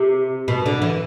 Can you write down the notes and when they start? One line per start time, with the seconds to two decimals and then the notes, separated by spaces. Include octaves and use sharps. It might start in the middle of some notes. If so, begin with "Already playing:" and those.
Already playing: C3
0.48 B2
0.66 D3
0.82 E3